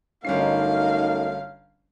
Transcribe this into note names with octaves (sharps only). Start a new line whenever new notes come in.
G1 F#2 A3 C#4 D#4 F5 C7